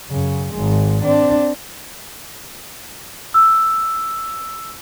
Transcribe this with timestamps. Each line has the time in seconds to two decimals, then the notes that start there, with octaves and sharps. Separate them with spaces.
0.10 F#2 C#3
0.54 G#1 G#3
1.03 C4 D4
3.34 E6